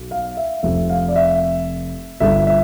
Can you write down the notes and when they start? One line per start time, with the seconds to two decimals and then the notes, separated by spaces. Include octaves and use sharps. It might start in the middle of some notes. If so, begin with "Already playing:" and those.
Already playing: B1
0.11 F5
0.37 E5
0.63 F1 F2 C3 E5
0.90 F5
1.08 D5
1.16 E5
2.20 G1 G2 D3 E5
2.47 E5